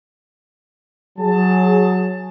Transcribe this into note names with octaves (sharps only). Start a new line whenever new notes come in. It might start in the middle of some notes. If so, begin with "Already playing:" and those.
F#3 G#4 A5